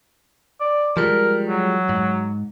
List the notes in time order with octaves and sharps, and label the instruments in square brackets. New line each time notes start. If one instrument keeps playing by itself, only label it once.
[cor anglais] D5
[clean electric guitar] F3 G3 G#3 [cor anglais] A#4
[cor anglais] F#3
[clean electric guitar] G#2